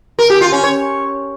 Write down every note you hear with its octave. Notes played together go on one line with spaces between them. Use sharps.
A#4
G4
F4
C#4
C#5